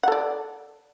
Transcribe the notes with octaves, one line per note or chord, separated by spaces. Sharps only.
A4 D5 F#5